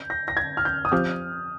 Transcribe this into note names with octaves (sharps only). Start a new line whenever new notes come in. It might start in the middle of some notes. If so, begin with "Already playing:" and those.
Already playing: G6
A#6
A#6
G#6
F6
G6
D#6
F3 C4 G4 C5 F6